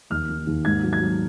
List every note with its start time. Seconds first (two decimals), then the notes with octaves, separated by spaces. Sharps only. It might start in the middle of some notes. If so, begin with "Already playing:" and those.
0.10 D#2 F6
0.29 D#3
0.47 D#2
0.65 G#2 G#6
0.83 F#3
0.93 G#6
1.01 F#3